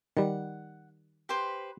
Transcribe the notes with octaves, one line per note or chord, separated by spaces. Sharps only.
D#3 G3 F#5
G4 B4 C5